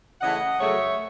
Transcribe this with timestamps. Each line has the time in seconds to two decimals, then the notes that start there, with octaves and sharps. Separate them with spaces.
0.21 C#3 E3 A3 D#5 F#5
0.60 F#2 C#3 F#3 A3 C#5 E5